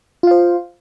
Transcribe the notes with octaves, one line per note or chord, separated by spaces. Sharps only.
F4 C5 F5